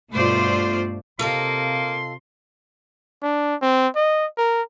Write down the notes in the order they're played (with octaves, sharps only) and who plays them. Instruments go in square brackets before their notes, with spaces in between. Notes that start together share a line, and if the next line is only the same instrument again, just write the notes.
[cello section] G2 B2 A3 F4 C5 D5
[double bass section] C3 [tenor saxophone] A#3 [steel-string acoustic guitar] F4 A4 D#5 [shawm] C6
[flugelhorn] D4
C4
D#5
A#4